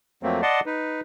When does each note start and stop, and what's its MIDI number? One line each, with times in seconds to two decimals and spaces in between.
0.23 0.41 41
0.23 0.41 54
0.23 0.41 57
0.23 0.41 58
0.23 0.41 60
0.42 0.60 74
0.42 0.60 75
0.42 0.60 78
0.42 0.60 81
0.42 0.60 84
0.66 1.01 63
0.66 1.01 71